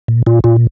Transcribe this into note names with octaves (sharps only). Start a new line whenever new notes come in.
A#2
A#2 F4
A#2 F4